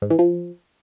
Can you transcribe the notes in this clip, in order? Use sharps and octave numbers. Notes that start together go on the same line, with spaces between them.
G#2
E3
F3